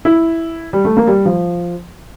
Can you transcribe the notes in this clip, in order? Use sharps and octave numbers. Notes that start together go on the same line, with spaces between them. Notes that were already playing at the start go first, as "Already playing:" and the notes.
E4
G3
A3
A#3
G3
F3